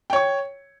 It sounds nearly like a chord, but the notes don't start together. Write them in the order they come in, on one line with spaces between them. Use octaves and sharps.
G5 C#5 C#6